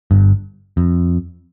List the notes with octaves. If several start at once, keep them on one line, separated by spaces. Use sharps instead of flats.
G1 G2
F2